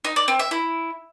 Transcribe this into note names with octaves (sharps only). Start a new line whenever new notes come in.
D#4
D5
C4
E5
E4